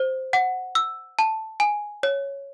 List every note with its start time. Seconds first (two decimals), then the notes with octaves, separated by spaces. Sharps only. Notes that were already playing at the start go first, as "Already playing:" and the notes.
Already playing: C5
0.33 F#5
0.75 E6
1.19 A5
1.60 G#5
2.03 C#5